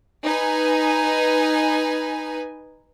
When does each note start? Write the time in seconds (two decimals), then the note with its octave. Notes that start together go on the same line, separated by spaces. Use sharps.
0.24 D#4 B4 G#5